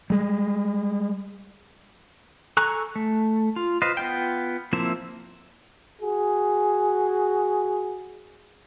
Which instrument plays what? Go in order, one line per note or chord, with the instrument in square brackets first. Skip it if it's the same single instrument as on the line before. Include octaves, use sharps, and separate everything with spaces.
[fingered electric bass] G3 G#3
[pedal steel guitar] A4 G#5 A#5 C#6 F#6
A3
F4
F4 B4 C5 D#5
B3 F4 G5
F3 A#3 C4 E4 E5
[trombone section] F#4 G#4